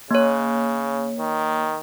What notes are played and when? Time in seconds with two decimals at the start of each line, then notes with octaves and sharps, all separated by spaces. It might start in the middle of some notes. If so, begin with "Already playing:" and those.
0.11 C#3 A#3 C#5
1.19 D#3